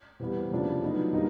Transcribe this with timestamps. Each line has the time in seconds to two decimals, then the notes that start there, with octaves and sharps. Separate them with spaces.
0.20 C3 E3 G3 B3
0.51 C#3 F3 A3 D4 F4
0.83 F#3 B3 D#4
1.13 D3 G3 A#3 D#4